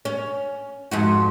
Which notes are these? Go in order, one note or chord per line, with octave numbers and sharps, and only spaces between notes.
C#4
F2 G#2 F#4